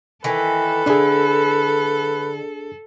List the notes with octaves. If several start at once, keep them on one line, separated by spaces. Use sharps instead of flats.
D#3 E3 E4 A4 B4
D3 D4 E4 G#4